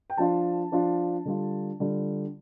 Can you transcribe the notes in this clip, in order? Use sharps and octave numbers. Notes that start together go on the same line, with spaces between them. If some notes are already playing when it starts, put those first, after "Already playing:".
G5
F3 D4 F4 A5
F3 D4 F4
D3 G3 F4
D3 G3 F4